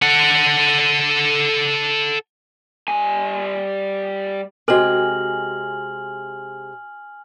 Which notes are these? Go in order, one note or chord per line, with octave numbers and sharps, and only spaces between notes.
A4 F#5
G3 G#5
C3 G#3 F#4 A4 G#5 F6 F#7